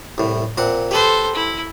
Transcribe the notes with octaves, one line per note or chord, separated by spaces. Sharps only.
C2 A2
A#2 C4 F#5
G4 A4 B4 C5
E4